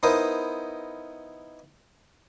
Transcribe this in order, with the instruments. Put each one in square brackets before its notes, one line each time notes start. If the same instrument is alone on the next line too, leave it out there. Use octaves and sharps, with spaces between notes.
[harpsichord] B3 D#4 E4 A#4 C5